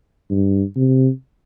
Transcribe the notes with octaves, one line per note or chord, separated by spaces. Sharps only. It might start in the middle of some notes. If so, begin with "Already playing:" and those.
G2
C3